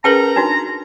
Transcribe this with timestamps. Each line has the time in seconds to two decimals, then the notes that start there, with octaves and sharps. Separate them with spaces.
0.04 C#4 G#4 A#4 B4 G5 A5 A#5
0.36 D4 D#4 F#4